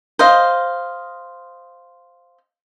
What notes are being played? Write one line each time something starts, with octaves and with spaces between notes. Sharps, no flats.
C5 D#5 F5